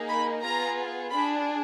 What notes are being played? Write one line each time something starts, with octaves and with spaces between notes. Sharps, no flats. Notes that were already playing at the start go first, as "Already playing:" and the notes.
Already playing: A#3 D#4 G#4
B5
B3 F4 G#4 A#5
D4 G#4 B5